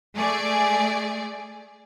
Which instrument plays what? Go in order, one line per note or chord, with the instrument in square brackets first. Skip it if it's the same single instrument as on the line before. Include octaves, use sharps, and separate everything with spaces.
[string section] A3 G#4 D5